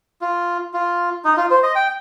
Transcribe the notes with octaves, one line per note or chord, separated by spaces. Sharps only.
F4
F4
D#4
F4
C5
D#5
G5